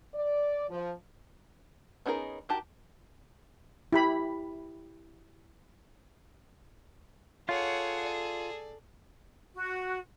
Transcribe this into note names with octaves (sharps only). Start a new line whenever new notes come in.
D5
F3
B3 C#4 D#4 G#4 A#4
D#4 F#4 G4 A#4 A5
E4 G4 B5
F4 G#4 A4 C#5 F#5
D5
F#4